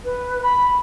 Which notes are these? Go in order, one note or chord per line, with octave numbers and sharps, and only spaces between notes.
B4
B5